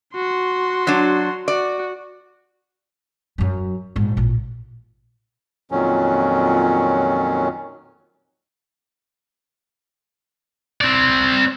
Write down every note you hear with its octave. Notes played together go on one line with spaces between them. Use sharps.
F#4 C6
F#3 D4
F#4 D5
F#2 F#3
A#1 G#2
A1 A#2
F2 A#2 D#3 F#3 C#4
C4 D5